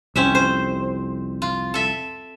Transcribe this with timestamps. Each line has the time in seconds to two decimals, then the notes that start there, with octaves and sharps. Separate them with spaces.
0.16 C2 F2 C4 C#4 E5
0.35 C5
1.42 F4
1.74 A4 E5